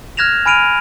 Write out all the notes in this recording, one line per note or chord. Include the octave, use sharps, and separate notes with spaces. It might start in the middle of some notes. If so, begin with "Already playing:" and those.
F6 F#6 G#6 A#6 E7 F7
G#5 B5 F6 D7 D#7 F7